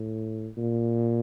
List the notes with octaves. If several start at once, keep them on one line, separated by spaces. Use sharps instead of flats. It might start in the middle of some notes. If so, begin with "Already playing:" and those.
Already playing: A2
A#2